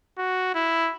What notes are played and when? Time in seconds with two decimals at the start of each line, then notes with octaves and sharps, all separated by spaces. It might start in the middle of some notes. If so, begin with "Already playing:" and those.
0.18 F#4
0.54 E4